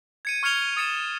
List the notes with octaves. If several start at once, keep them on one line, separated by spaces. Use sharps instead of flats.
G#6 C#7 D#7
C#6 F6 G#6 C#7 F7 G7
D#6 A6 C#7 E7